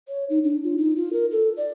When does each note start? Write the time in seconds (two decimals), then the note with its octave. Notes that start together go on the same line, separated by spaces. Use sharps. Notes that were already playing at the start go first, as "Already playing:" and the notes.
0.08 C#5
0.30 D#4
0.44 D4
0.64 F4
0.78 D#4
0.96 F4
1.13 A#4
1.31 A4
1.57 D5